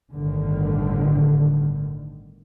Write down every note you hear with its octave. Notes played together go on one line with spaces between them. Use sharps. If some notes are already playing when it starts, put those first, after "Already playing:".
G1 A2 D3 D#3